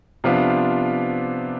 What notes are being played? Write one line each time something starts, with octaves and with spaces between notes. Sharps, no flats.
C3 F3 B3 D4 F4